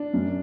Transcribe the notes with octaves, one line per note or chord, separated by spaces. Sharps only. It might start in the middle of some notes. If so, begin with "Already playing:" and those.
Already playing: D4
F#2